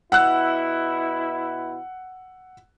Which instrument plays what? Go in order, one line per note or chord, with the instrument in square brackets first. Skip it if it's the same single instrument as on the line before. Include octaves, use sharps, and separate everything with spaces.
[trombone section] B2 E4 [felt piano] F#5 E6 F#6